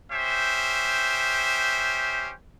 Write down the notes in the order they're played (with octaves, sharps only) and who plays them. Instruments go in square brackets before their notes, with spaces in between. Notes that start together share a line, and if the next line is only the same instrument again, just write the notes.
[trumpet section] C#4 G4 C5 E5